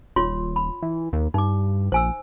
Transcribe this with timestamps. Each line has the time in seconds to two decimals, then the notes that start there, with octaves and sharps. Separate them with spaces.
0.16 D#1 F4 C#5 C6
0.56 B5
0.83 E3
1.13 D#2
1.34 G2 D#4 D6
1.92 A#1 C5 G#5 E6